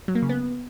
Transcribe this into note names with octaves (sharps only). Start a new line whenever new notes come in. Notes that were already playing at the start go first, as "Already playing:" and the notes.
F#3
A#3
C#3
B3